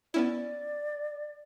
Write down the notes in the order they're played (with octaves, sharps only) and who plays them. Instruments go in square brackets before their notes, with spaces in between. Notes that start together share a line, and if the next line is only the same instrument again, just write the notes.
[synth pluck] B3 C#4 E4 [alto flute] D5